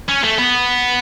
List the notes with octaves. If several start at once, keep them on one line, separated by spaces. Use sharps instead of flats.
C#4
A3
B3